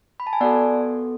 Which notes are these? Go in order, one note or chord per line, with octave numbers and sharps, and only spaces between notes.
B5
A5
G#5
B3 F#4 A4 D5 F#5